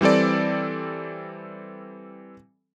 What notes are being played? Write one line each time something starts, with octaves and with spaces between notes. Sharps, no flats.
E3 G3 C4 A4 D5